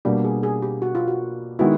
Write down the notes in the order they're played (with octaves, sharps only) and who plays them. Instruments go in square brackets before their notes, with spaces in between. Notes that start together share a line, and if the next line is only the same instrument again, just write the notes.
[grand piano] B2 G3 A#3 D4 F#4 [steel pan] G4
[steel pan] G#4
G#4
G4
F#4
F4
F#4
[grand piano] D#3 G#3 B3 E4 [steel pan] F#4